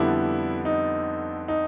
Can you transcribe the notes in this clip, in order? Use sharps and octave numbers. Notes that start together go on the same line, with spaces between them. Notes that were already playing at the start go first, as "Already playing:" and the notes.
Already playing: F2 D3 G3 B3 D4 E4
D#4
D#4